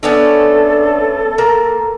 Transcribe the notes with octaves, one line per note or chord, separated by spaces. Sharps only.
A3 B3 C#4 D4 A4
A#3 A#4